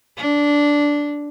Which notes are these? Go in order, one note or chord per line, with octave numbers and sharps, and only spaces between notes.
D4